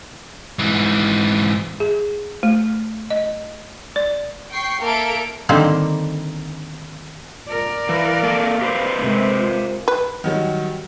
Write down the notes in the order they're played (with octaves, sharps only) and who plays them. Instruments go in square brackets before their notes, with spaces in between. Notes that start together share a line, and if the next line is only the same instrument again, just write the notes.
[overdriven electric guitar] G#2 E3
[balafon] G#4
A3
D#5
D5
[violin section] G5 C#6 C7
A#3 A4 A#4 E5 D7
[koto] D3 D#3 G3 A#3 C4
[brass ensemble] F2 A#2 D3 [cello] A#4 D5
[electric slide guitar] E3 [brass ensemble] F5
[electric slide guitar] A#3 A4
G4 B4 C5
[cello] C3 G#3 [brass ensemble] A3 A#4
[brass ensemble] C#3 F4 A#4
[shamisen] B4
[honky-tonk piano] D#3 F#3 G3